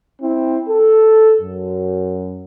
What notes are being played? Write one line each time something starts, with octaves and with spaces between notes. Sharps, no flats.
C4 E4
A4
F#2